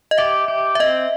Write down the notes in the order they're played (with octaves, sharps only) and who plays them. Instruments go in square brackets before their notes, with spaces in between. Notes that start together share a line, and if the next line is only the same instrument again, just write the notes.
[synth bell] D#5
[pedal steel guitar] G4 [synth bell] E5
[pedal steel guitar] G4
[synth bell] E5
[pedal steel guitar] C4 [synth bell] D#5